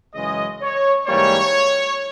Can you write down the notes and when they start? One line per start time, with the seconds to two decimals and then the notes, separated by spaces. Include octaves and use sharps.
0.14 F#2 C#3 E3 G#3 D#5
0.61 C#5
1.07 G#2 E3 G3 A#3 C#5